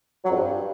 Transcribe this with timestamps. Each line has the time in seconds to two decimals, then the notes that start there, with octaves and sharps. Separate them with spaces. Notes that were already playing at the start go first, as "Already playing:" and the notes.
0.25 F#3
0.30 F2
0.35 G2